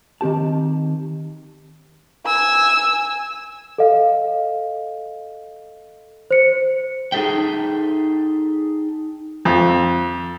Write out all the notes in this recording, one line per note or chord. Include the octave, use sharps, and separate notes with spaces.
D#3 C4 G4 A5
G#5 E6
A4 D#5 F5
C5 C#7
D#4 G#4 A4 E5 G5
F2